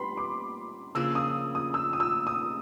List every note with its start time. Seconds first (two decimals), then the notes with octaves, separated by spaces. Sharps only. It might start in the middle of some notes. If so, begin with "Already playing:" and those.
Already playing: G3 B3 D4 B5 C6
0.17 D6
0.95 C#3 F3 A#3 D4 E6
1.15 D#6
1.55 D#6
1.74 E6
1.93 D#6
2.00 E6
2.27 D#6